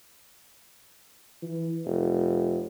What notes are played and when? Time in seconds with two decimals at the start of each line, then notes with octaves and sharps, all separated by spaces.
1.42 E3
1.85 F1